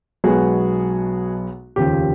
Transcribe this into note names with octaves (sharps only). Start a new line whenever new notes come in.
B1 B2 G#3 B3 F#4 G#4
F1 D#2 C#3 F3 G4